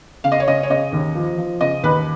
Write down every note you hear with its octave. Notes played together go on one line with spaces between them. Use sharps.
C#3 F5
D#5
C#5
C#3 D#5
C#5
C#3 D#5
D#2
F3
F3
C#3 D#5
D#2 B4